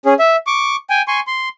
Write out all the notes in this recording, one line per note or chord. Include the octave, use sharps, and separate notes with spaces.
C#4 G#4
E5
C#6 D6
G5 G#5
G#5 C6 C#6
C6